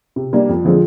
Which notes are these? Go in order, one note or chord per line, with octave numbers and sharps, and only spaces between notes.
C3
G3 A#3 D4
F2
D3 F3 G#3 C4